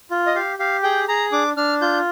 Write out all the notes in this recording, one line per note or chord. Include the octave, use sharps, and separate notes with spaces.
F4
D#5
G4 F5
G4 F5
G#4 G5
G#4 A#5
D4 D6
D4 F6
F4 G6